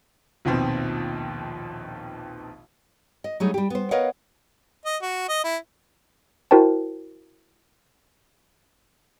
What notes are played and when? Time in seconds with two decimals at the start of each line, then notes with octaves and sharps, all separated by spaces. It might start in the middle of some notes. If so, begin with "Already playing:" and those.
0.45 A#1 D#2 B2 C4
3.24 D#5
3.40 F#3 G3 A3 D#4 G#4
3.54 G3 G4
3.70 B3 C5
3.91 A#4 B4 C#5 D#5 F5 F#5
4.86 D#5
5.02 F#4
5.29 D#5
5.44 E4
6.51 E4 F#4 A#4 C5 G5 A5